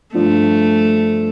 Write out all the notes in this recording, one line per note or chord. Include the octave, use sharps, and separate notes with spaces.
G2 F3 A3 D4 F4